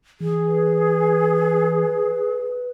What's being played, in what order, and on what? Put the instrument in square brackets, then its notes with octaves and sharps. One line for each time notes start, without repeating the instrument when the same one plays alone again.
[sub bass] E3 [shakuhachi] G#4
[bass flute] B4